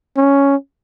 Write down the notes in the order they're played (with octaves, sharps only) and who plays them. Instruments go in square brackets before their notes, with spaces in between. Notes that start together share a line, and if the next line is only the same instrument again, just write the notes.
[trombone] C#4